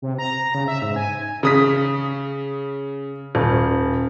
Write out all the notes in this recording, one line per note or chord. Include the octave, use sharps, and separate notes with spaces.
C3
A#5
C#3
E5
G#2
G#5
C#3 D#6 B6
D#1